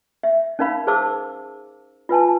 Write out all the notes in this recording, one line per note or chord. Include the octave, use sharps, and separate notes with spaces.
E5
C#4 D#4 A#4 F5 B5
G#4 A#4 C5 A5 D6 E6
F4 B4 G#5 A5